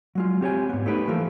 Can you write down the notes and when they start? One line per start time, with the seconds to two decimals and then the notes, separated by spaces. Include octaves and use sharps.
0.15 F#3 G#3 F4
0.41 C4 G4 C#5 G#5
0.69 G#2 B3
0.86 A3 D#4 G4 B4
1.08 E3 F3 A3 A#3